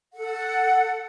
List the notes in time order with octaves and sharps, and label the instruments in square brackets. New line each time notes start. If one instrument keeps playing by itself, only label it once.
[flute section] A4 F#5